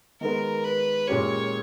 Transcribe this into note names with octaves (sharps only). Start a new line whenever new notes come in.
D#3 G#3 B3 A#4
B4
A#2 G#3 C#4 G4 A#4 C#5